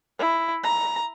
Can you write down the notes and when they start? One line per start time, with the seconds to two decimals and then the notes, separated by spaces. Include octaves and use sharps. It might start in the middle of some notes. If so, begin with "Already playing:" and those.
0.19 E4
0.64 A#5